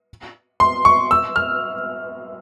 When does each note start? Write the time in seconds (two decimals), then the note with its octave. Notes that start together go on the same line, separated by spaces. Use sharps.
0.60 C6
0.85 C#6
1.11 E6
1.36 F6